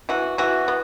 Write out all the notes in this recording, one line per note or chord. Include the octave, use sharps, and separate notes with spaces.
E3 F#4
E3 F#4
B3